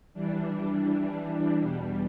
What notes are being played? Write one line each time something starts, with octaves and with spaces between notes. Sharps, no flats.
E3 G3 D4
E2 B2 G3